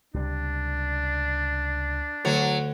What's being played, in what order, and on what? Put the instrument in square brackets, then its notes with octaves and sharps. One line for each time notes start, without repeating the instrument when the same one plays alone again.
[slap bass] C#2 C3 G3 [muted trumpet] D4
[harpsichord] D2 [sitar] F#3